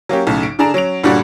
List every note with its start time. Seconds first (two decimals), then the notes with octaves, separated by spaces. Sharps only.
0.09 F#3 A#3 C#4 G4
0.27 B1 A2 C#3
0.43 D7
0.59 D3 D4 G#4 A#5 E7
0.74 F#3 C#4 D7 F7
1.03 G1 A#2 D3 G3 D4 F#4